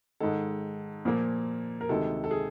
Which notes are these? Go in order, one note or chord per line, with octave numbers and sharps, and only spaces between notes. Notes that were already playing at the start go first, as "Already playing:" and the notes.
G#2 D#3 G#3 A4
A#2 F3 A#3
A#4
D2 C3 D#3 G#3 A4
A4
G#4